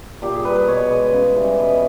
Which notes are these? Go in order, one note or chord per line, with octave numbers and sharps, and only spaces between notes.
A#2 G4
G#4
G3 B4
B4
B2 C#5
G#3
C#3
E3 G3
B2 B4